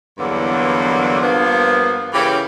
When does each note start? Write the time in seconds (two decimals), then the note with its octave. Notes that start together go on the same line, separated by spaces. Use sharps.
0.18 E2 G2 D3 E3 F#3 A#3
1.21 G2 F3 A#3 B3
2.14 C#3 E3 A#3 C#4 G4